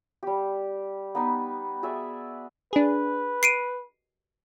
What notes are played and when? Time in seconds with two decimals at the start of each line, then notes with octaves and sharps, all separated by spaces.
0.23 G3 G4
1.15 B3 D#4 B4
1.83 F#4 G#4 D5 E5
2.73 D4 G#4 B4
3.43 C7 D7 D#7